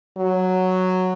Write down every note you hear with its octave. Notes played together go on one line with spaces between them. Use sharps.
F#3